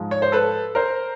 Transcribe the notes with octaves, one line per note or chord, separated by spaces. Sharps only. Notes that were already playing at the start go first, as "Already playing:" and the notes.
Already playing: G#2 F3 G#3
C#5
C5
A4 B4
A#4 C5